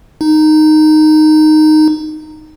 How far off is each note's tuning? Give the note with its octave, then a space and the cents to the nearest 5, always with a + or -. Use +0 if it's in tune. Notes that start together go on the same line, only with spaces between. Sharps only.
D#4 -10